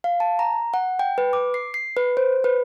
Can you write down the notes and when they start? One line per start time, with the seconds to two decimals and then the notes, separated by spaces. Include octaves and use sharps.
0.04 F5
0.20 A5
0.39 A#5
0.74 F#5
0.99 G5
1.18 B4
1.33 D6
1.54 C7
1.74 C7
1.97 B4
2.17 C5
2.44 B4